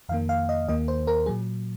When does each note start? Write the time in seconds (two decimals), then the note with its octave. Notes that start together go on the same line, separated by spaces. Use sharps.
0.09 F2 D#3 A#3 F5
0.29 F5
0.49 D#5
0.68 D#2 D#3 A#3 D#5
0.88 C5
1.07 A#4
1.26 A#2 F#3 G#4